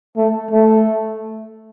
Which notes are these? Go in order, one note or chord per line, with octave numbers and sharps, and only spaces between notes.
A3
A3